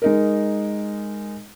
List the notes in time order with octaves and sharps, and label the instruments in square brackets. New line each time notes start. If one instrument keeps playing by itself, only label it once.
[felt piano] G#3 D#4 A#4